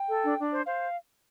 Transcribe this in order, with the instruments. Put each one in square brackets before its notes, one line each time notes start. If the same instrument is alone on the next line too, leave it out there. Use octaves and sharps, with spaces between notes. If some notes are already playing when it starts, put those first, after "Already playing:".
Already playing: [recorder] G5
[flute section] A4
D4
D4
C5
[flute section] C5 [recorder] F5